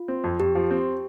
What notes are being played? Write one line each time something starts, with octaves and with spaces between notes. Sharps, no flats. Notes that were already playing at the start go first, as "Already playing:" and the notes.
Already playing: F4
C4
F2
F2 G4
F3
C4